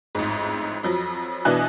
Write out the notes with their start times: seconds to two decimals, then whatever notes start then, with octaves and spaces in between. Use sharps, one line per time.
0.15 A1 F2 G#2
0.83 F2 F3 F#3
1.45 B2 E3 D4 G#5 F#6